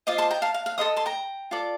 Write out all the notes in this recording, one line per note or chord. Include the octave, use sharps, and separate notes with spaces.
F4 C5 D#5 D6
A5 C6
G5 A#5
F5 A5
F5
F5
A4 C5 D#5 C6 D#6
A5 C6
G5 A#5
F4 A4 D5